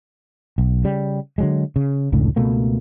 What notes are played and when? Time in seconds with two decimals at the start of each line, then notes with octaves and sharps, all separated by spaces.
0.58 B1
0.84 C#3 G3
1.38 D3 F#3 G#3
1.76 C#3
2.12 F1 C#2 A2 D3
2.36 C#2 B2 A3 A#3